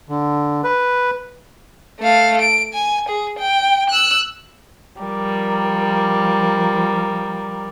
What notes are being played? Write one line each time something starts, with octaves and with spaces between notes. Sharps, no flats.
D3
B4
A3 F5
D7
G#5
G#4
G5
E6 F#6
F3 G3 A#4